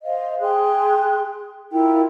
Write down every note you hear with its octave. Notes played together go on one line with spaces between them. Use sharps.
C5 D#5 F5
G#4 G5 C6 F#6
E4 F4 A#4 G5